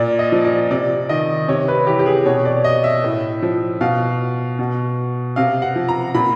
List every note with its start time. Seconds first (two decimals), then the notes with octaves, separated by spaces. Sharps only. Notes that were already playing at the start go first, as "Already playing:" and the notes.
Already playing: A#2 D5
0.19 D#5
0.32 F3
0.45 D5
0.71 C3 D5
1.09 D#3 D#5
1.48 C3 C#5
1.68 B4
1.87 E3 G4
1.99 G4
2.06 G#4
2.25 B2 C#5
2.45 D5
2.64 D#5
2.84 E5
3.04 A2
3.42 F3
3.81 B2 F5
4.59 B2
5.36 C3 F5
5.62 F#5
5.76 F3
5.89 A#5
6.14 A#2 B5